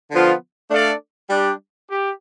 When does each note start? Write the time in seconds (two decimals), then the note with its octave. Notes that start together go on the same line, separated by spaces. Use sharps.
0.11 D3 F3 B3 F4
0.70 A3 D4 A4 D5 F5
1.29 G3 D4 G4
1.89 G4